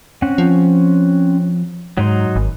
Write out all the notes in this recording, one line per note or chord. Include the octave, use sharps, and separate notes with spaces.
C4 C#4 F#5
F3
G#2 F#3 D#4 C6
G#1